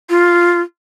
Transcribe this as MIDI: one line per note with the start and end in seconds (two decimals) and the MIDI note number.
0.10 0.62 65